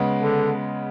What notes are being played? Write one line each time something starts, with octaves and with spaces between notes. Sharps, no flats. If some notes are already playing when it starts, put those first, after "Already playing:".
Already playing: C#3 G#3 B3
D3